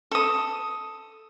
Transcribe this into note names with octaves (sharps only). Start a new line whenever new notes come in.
A4 D#6